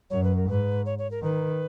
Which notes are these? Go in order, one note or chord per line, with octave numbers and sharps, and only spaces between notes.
F#2 C#5
B4
A#4
G#2 B4
C#5
C#5
A#4
D#3 B4